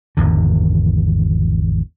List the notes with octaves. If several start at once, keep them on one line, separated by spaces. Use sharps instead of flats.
G#1 E2 D3